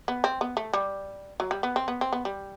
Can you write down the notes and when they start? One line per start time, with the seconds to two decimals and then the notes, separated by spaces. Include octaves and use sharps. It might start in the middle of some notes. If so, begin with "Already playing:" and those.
0.08 B3
0.24 C4
0.41 B3
0.57 A3
0.73 G3
1.40 F#3
1.51 G3
1.63 B3
1.76 C4
1.88 B3
2.01 C4
2.13 B3
2.25 G3